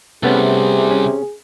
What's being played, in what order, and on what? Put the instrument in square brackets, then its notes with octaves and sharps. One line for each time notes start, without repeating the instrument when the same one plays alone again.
[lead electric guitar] C2 [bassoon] C3 [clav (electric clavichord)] A3 B3 C#4 [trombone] G#4
[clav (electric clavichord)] C#4